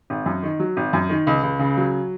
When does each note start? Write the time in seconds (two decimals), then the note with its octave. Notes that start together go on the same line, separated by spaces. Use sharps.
0.10 G#1
0.26 F#2
0.43 D#3
0.60 F#3
0.77 G#1
0.93 F#2
1.09 D#3
1.27 C#2
1.43 C#2
1.59 C#3
1.77 F#3